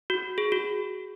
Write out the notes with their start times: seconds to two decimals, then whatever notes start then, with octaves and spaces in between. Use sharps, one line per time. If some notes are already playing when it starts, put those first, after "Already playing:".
0.10 F#4
0.38 G#4
0.52 F#4